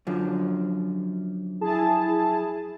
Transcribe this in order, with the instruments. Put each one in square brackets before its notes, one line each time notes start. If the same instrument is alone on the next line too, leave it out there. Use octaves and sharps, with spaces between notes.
[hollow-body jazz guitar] F#2 D3 F3
[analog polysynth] E4 G#4 A5